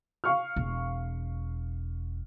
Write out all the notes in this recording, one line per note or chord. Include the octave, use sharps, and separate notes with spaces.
F5 C#6 F6
E1